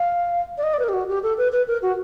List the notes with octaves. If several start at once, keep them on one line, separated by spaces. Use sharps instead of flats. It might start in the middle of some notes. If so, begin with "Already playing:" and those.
Already playing: F5
D5
D#5
D5
B4
A#4
G4
F#4
G4
A4
B4
B4
A#4
F#4